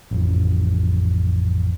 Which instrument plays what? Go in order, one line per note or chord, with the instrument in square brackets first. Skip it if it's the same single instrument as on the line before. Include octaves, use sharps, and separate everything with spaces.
[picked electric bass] A1 F2